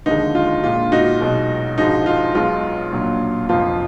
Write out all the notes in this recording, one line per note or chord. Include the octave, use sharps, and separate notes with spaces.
D#2 D3 F3 G#3 D#4
F4
A#1 A#2 G#3 F4
D#4 F#4
B1 B2 G#3
A#1 G#2 F3 G#3 D#4 F#4
F4
B1 B2 G#3 F4
A#1 A#2 F#3
F1 F2 F3 F4